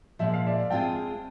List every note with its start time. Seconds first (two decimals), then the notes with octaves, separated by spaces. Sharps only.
0.19 A#2 F3 G#3 E5
0.33 F5
0.46 D5 E5
0.70 G#3 C4 F4 G#4 G5 A5